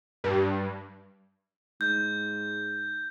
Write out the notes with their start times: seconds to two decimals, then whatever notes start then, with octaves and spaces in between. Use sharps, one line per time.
0.24 G2
1.81 G#2 G6